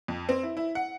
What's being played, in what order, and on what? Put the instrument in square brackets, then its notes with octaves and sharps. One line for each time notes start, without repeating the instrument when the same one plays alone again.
[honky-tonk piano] F2
C4
E4
E4
F#5